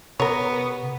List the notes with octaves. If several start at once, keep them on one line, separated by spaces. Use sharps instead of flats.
C3 B3 A#4 C#5